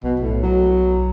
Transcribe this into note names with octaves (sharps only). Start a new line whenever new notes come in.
B1 B2
A2
F#3